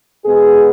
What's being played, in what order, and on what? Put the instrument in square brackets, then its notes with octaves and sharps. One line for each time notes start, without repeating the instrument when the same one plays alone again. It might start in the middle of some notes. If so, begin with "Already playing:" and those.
[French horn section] B2 G#3 B3 G#4